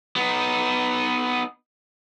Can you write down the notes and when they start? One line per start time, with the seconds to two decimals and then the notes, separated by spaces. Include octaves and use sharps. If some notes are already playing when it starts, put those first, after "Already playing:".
0.16 B3 D#4